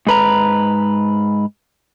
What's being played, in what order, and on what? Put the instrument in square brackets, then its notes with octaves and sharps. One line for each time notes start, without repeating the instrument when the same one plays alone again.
[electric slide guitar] G#2 B4 A#5